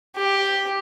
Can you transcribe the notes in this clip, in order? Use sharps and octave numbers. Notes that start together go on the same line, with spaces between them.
G4